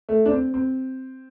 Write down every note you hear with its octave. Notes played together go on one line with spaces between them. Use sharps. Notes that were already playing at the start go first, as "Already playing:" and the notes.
A3
D4
C4
C4